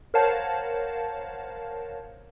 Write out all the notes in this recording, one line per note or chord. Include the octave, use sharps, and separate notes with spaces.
A#4 C5 C#5 F5 F#5 A5